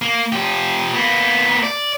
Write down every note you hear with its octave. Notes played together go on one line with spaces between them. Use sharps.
A#3
F3 G4
A#3 B3
D5